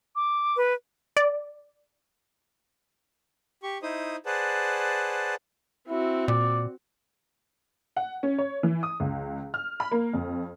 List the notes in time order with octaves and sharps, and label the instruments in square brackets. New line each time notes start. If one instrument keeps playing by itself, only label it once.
[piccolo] D6
[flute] B4
[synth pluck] D5
[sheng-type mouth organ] G4 C#6
D#4 E4 C5 D#6
G#4 B4 C5 D5 F#5 A5
[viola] C4 F#4 [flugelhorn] E4
[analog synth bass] A#2 [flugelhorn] D5
[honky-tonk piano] F#5
C#4
C#5
E3
D#6
C#2
F6
B5
A#3
F2